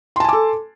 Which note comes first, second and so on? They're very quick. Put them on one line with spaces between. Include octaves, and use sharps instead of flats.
C6 A5 G#5 D6 A4